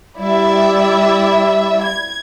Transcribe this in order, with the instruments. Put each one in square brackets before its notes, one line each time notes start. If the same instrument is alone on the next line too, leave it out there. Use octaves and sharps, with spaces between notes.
[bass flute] G3 [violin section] E4 D5 E5
[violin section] G#6